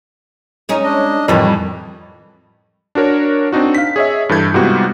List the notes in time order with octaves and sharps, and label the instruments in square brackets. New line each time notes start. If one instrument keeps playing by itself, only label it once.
[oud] G#3 C#4 D#4
[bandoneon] D4 D#5
[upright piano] F2 [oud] A2 G3 B4 [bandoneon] D#3 E3
[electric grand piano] D4 F#4 A#4 C#5
C4 D4 D#4 F#4
F5 B6
G#4 C#5 D#5 E5
G2 E3 A4 G6 G#6
G#2 C3 G3 B3 F4 F#4